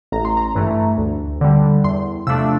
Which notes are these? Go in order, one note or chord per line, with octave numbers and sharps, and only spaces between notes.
A1 A#5
C6
A#5
G2 E3 A3
D2
D3 G3
E2 C6
C3 F3 A3 D4 E6